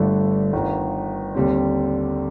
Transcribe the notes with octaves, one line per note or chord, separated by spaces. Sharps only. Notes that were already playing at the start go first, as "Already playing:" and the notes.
Already playing: G1 G2 D3 A3
G1 G2 D#3
D#2 D3 G3 C4